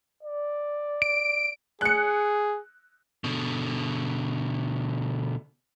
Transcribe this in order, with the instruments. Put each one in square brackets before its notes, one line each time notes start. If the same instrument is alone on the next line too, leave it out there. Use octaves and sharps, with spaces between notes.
[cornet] D5
[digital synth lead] D7
[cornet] G#4 [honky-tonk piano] F#6 C#7
[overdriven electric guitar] B2 D3